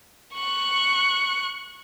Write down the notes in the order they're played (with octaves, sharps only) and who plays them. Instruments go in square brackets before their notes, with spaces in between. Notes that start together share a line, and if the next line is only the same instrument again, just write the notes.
[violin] C#6 F#6